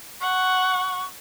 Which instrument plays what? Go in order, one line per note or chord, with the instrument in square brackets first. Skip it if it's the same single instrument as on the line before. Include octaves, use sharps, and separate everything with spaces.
[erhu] F#5 [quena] C#6